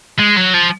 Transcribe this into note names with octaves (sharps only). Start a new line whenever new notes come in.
G#3
F#3
F3